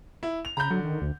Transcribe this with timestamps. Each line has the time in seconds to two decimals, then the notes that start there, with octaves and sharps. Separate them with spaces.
0.23 E4
0.45 F7
0.57 C#3 A#5 B5 G6
0.70 D3 F#3
0.84 D#3
1.01 D2